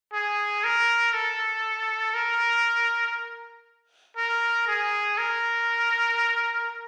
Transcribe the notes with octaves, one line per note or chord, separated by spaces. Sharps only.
G#4
A#4
A4
A#4
A#4
G#4
A#4